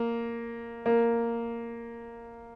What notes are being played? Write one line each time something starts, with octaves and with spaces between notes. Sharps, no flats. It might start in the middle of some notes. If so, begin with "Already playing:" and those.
Already playing: A#3
A#3